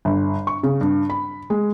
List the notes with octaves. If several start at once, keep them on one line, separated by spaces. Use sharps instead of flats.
G1
C#6
C#3
G2
B5
G#3